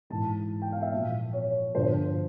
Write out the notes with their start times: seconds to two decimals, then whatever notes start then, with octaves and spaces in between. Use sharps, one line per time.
0.10 G#2 E3 A5
0.62 G5
0.72 F5
0.82 E5
0.93 A#2 F3
1.33 C#5
1.75 G2 D3 F3 C5